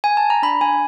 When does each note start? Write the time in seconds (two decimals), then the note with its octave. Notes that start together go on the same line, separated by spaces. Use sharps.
0.04 G#5
0.17 A5
0.30 A#5
0.42 D4 B5
0.61 D4 G#5